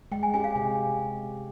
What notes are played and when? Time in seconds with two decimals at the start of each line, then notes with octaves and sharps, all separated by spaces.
0.12 G#3 G5
0.23 G#5
0.34 C#4 G4 G#5
0.44 F5
0.56 C3